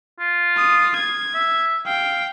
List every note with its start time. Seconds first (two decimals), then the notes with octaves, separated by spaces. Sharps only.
0.20 F4
0.57 D#6
0.96 G#6
1.35 E5
1.86 F5 G5